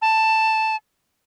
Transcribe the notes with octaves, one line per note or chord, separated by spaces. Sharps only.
A5